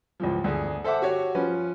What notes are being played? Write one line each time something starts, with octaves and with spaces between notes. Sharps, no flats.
C#2 E3 F3
D2 G#4
A4 C5 E5 F#5 D6
F#4 G4 C#5
F3 C#4 B4